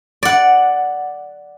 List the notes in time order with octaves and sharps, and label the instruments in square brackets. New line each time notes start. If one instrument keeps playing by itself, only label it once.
[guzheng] D5 F#5